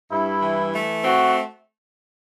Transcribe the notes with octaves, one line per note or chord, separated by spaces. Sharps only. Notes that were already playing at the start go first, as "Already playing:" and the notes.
G2 E4
E3
A3
C4 F#4